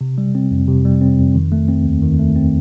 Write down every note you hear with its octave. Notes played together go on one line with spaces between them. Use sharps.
C3
G3
C4
F2
C3
G3
C4
F2
D#3
A3
C4
D#2
D#3
A3
C4